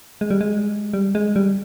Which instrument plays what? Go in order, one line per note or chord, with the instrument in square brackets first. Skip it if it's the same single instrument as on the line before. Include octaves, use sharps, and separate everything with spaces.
[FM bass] G#3
G3
G#3
G3
G#3
G3